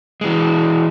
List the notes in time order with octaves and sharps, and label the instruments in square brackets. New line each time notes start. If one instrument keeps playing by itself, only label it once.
[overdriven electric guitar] E3 G#3